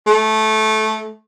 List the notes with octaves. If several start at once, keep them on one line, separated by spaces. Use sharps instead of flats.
A3